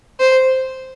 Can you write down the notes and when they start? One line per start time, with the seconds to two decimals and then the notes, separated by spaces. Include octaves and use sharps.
0.19 C5